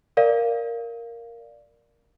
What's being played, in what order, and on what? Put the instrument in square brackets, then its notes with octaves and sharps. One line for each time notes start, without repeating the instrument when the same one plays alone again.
[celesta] A#4 D5 F5